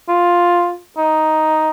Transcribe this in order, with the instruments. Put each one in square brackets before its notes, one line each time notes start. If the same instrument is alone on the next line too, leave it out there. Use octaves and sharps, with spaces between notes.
[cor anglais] F4
D#4